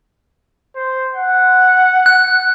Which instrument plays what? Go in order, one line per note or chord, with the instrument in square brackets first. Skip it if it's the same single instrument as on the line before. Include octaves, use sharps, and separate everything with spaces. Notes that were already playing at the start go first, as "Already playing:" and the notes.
[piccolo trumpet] C5
F#5
[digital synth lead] F#6